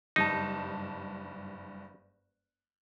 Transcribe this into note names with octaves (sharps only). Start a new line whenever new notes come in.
F#1 G2 D#4 A5